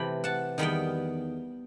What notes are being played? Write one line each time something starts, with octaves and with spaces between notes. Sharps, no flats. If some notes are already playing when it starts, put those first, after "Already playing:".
Already playing: C3 E3 A3 G5 B5
F#5 A5
E2 D#3 G3 B3 G5 B5